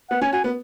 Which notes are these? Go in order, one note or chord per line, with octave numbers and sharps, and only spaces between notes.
B3 F#5
C#4 G#5
F#4 G#5
B3 B4